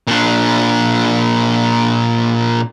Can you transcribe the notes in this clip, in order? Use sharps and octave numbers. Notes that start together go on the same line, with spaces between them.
A#2 D4